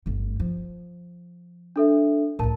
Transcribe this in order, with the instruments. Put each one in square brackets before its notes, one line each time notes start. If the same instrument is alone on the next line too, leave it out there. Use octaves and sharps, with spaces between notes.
[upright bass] G1 A3
F3
[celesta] D4 A4 E5
[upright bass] C#2 A2 [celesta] A#4 A5